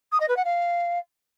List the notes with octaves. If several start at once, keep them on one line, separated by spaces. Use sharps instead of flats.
D#6
D#5
B4
F#5
F5